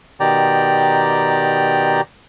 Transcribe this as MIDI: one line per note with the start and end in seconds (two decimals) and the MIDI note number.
0.20 2.01 47
0.20 2.01 51
0.20 2.01 67
0.20 2.01 74
0.20 2.01 79
0.20 2.01 82